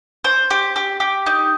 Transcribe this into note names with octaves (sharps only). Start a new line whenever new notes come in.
C5
G4
G4
G4
D#4